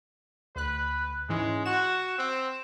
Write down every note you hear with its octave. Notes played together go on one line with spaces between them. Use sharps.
D2 B4 F#6
G#2 E3 G#3 C#4
F#4 E7
C4